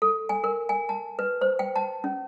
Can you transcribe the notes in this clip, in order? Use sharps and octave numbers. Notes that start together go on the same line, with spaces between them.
A4
G#5
A#4
G#5
A5
B4
C5
G5
A5
C#4